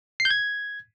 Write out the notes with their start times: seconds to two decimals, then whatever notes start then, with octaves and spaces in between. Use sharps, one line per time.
0.20 C7
0.25 G6
0.30 G#6